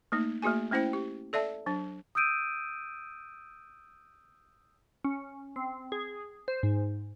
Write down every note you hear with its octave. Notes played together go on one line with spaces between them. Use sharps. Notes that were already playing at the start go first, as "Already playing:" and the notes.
A3 A#3 D#4
A3 A#3 F#4 G#4 G#5
A3 C#4 E4 C5 G5
G4
A4 D5 E5 A5
F#3 D4
D#6 E6 G6 D7 D#7
C#4
C4
G#4
C5
G#2